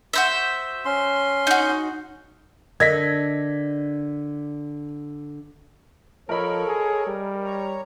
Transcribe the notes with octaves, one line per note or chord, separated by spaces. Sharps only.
F#4 C5 E5
C#4 C6
D#4 F#4
D3 D4 A#4 D#5 G#6 A#6 B6
F3 A4 A#4 C#5 D#5 B5
G#4
G3
C#5 A#5